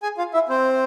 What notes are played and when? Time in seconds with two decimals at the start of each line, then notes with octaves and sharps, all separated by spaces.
0.03 G#4 G#5
0.18 F4 F5
0.33 E4 E5
0.49 C4 C5